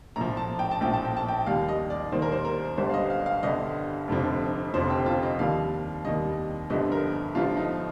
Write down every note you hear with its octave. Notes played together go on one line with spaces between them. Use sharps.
A#1 A2 F3 A#5
A5
G5
A5
A#1 A2 F3 G5
A5
G5
A5
G5
D#2 D#3 G3 F5
D#5
D5
D#2 D#3 G3 C5
A#4
C5
A#4
G1 G2 D3 G3 C5
F5
D#5
F5
F5
G1 G2 D3 G3 D#5
F1 F2 D3 F3
F1 F2 D3 F3 C5
G4
F4
D#5
D#2 D#3 G3 F5
D#2 D#3 G3 D#5
G1 G2 D3 F3 D#5
A#4
G1 G2 D3 F3 F4
D#4